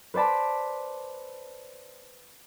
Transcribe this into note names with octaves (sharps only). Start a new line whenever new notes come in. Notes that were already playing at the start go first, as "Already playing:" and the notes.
B4 C5 D5 A5 B5